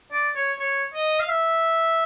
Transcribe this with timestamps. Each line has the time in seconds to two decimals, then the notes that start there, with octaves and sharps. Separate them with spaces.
0.12 D5
0.36 C#5
0.59 C#5
0.94 D#5
1.20 F5
1.29 E5